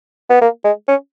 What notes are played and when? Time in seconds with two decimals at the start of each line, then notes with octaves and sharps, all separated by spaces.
0.30 B3
0.41 A#3
0.65 G#3
0.88 C#4